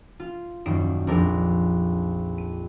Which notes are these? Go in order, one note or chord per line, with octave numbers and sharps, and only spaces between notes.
F4
D#1 F#2 D#4 C7 D7 E7
A#1 F2 C4 D4 A#4
D#7